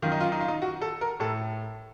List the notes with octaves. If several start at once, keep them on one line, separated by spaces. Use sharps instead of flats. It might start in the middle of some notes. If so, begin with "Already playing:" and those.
F#2 D#3 F4
D#4
F4
D#4
F4
D#4
F#4
A4
A#4
A2 A4